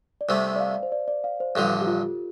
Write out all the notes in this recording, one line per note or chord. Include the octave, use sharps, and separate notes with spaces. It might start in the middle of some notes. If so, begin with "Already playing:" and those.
D5
C2 C3 A3 C5
D5
F5
C5
D5
D5
F5
C5
A1 G2 D3 F3 A4
G4
F4